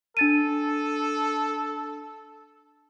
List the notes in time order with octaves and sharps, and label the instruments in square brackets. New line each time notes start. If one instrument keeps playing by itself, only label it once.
[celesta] D4 A6 D#7 [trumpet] A4